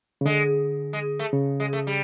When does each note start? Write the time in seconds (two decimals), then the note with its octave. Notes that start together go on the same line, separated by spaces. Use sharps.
0.21 C#3
0.25 D3 G#3
0.93 G#3
1.19 A3
1.33 C#3
1.60 G#3
1.73 A3
1.87 G3